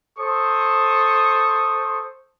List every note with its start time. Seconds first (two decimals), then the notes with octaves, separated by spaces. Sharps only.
0.19 A4 C5 C#6 D#6